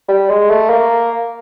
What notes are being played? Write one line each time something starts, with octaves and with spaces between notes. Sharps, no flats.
G3
G#3
A3
A#3